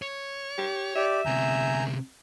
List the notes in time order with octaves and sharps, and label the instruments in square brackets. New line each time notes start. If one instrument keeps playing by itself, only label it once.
[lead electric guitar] C#5
[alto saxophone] G4
[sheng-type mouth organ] G4 D5 [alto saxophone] E5
[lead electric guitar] D2 C3 [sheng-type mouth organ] G#5 A#5 G6